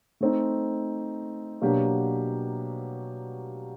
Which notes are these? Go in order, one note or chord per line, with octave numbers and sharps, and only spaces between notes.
A3 C4 D#4
B2 F#3 A#3 D4 G4